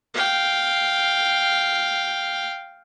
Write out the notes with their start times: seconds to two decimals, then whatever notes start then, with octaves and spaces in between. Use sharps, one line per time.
0.14 F5 G5